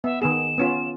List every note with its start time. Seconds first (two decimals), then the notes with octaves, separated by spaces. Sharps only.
0.04 B3 E5
0.22 D#3 B3 G#4 E7
0.58 B3 C#4 F4